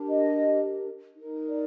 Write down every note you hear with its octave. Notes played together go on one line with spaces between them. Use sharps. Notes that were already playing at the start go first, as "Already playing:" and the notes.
Already playing: D4 G4 A#4
D#5
D#4 A#4
D5